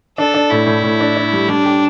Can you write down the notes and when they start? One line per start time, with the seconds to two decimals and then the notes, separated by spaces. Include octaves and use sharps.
0.18 D4 A4
0.34 D4
0.50 A2 E4
0.67 A2
0.83 A2
1.00 D4
1.17 D4
1.33 G3
1.48 G3 D4
1.66 G4